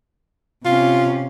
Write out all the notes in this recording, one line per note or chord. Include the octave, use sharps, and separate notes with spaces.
C3 C#4 F4